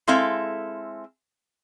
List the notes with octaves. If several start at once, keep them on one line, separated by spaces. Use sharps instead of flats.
G#3 C4 E4 A4 E5 F5